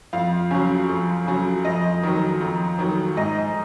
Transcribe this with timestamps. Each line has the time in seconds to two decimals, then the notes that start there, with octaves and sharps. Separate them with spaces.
0.13 F2 F5
0.51 C#3 F#3
0.89 F2
1.27 C#3 F#3
1.65 F2 D#5
2.03 D#3 F#3
2.41 F2
2.79 D#3 F#3
3.17 G#2 D#5